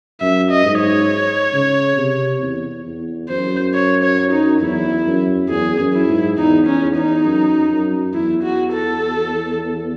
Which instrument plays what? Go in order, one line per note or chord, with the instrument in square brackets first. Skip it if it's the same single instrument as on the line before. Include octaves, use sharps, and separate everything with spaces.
[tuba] F#2 [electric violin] E5
[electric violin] D#5
[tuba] G#2
[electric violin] C#5
[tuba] C#3
C3
E2
E2
[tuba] F#2 [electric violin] C5
[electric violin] C#5
C#5
D#4
[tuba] E2 [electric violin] E4
[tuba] F#2
[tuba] E2 [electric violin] G#4
[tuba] F#2
[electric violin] E4
[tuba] G#2
[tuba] E2 [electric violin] D#4
[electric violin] C#4
[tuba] E2
[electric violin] D#4
[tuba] F#2
F#2
[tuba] E2 [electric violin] E4
[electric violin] F#4
A4